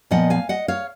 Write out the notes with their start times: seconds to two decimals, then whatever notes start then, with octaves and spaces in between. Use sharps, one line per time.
0.11 A#2 F3 B3 D#5 F#5
0.30 F5 G#5
0.49 D#5 F#5
0.68 C#5 F5